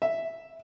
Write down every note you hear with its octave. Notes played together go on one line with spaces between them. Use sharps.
E5